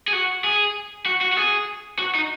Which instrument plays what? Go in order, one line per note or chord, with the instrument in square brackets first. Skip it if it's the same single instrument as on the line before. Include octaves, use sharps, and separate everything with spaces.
[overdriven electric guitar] G#4
F#4
G#4
F#4
F#4
F#4
G#4
F#4
D#4